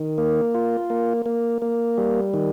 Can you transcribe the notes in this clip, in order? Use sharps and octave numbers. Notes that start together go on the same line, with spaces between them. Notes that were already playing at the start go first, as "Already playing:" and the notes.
Already playing: D#3
A#3
F4
A#3
A#3
A#3
G3
D#3